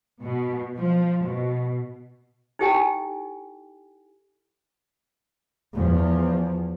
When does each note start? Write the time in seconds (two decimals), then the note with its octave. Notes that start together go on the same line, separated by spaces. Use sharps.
0.23 B2
0.77 F3
1.24 B2
2.59 D#4 E4 G4 A4 G5 G#5
5.74 E2 F3